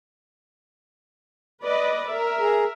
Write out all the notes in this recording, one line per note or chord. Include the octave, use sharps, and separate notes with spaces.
B4 D5 D#5
A#4 E5
G#4 A#5